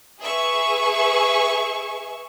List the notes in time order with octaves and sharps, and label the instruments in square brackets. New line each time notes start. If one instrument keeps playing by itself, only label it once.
[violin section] G#4 B4 E5 C#6